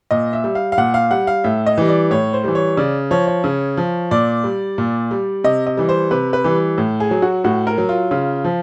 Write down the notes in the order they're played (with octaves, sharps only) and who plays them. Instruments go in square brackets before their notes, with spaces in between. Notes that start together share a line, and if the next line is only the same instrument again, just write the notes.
[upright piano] A#2 D#5
E5
G3
F5
F5
A#2 F#5
F5
G3 F#5
F5
A2 E5
D#5
E3 G3
D5
A2 C#5
C5
E3 G3
C#5
C#3 D5
F3 C#5
C#5
C#3
F3
A#2 D5
G3
A#2
G3
C3 D#5
D#5
E3 G3
C5
C3 B4
B4
E3 G3
A2
G#4
F#3
F#4
A2 F#4
A#4
F#3
F4
C#3 F4
F3